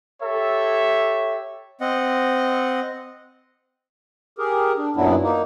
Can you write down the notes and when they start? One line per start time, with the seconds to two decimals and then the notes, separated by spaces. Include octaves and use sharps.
0.23 G4 A4 C#5 E5
1.81 C4 D#5 F#5
4.38 G4 G#4 A#4
4.78 D4
4.96 F#2 A#2 F#3 B3 D4 E4
5.22 A#3 D#4